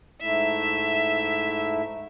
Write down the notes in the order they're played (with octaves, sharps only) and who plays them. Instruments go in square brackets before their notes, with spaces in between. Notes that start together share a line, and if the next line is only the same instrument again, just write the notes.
[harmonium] G#2 A3 E4 [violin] E5